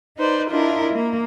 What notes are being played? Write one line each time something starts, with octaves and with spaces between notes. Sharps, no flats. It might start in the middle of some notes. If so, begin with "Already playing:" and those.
D#4 B4 C5 D5
D4 E4 F4 A#4 D#5
A#3